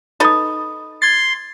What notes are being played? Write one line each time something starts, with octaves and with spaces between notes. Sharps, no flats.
D#4 A4 B4 B5 D#6
C6 G#6 A6